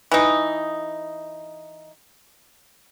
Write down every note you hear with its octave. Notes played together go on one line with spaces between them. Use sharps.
E3 D#4